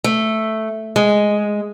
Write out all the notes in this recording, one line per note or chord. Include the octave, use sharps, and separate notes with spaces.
A3
G#3